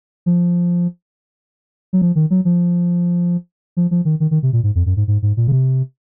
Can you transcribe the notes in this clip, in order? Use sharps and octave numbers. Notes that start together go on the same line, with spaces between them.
F3
F#3
F3
D#3
F#3
F3
F3
F3
D#3
D#3
D#3
C3
A#2
G#2
F2
F#2
G#2
G#2
G#2
A#2
C#3
C3